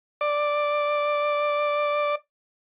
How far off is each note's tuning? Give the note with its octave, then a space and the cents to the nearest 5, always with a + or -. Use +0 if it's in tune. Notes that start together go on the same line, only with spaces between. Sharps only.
D5 +5